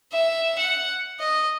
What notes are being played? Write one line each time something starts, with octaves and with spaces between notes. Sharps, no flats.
E5
F#5
D#5